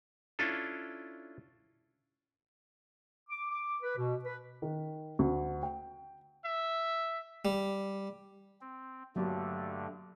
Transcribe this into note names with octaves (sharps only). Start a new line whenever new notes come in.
C#4 D4 E4 F4 A4
D6
D6
B4
B2
B4
D#3
D2
G5
E5
G3
C4
G2 D3 F#3 A3 A#3 G4